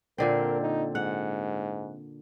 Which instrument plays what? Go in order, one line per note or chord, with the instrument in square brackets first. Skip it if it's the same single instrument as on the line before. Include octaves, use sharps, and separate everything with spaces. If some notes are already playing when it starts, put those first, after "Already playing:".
[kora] A#2 D3 C4 [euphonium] A#4
[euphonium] D#4
[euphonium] G#2 [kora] F#5